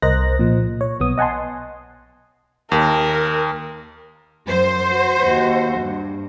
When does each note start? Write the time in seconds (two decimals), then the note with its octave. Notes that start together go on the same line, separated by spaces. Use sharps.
0.02 C2 A#4 C5 D#5 F#6 A#6
0.39 A#2 F3
0.81 C#5
1.00 B1 B3 D#6
1.18 D#5 F#5 G#5 A5 C6
2.72 D#2 A#4
4.48 F#2 C5
4.89 F#4
5.20 D#2 F#4
5.80 G2